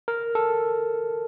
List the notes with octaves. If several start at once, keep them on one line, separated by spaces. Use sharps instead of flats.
A#4
A4